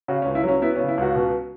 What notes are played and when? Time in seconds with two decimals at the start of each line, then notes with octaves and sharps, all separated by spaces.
0.08 C#3 F#4
0.22 C#4
0.26 C#2
0.35 E4
0.44 F#3 C#4
0.62 B3 E4
0.75 C#4
0.80 C#3
0.88 E4
0.98 C#2 F#4
1.15 B2